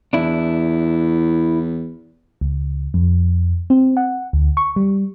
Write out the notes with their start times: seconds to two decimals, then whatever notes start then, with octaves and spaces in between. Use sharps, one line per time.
0.13 E2 D4 E4
2.41 C#2
2.94 F2
3.70 C4
3.97 F#5
4.33 D2
4.57 C#6
4.76 G3